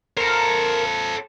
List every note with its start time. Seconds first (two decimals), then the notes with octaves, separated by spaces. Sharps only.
0.17 A4 A#4 C5